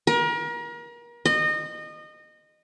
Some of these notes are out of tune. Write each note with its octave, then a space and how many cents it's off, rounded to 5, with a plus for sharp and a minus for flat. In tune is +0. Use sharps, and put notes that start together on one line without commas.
A#4 +35
D#5 -25